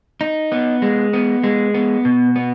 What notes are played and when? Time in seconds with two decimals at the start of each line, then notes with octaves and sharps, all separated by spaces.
0.21 D#4
0.52 B3
0.82 G#3
1.13 B3
1.43 G#3
1.74 B3
2.05 B2
2.36 B3